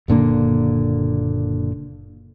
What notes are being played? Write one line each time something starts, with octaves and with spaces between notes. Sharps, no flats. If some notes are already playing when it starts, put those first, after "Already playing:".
F#1 A#2 D3 A#3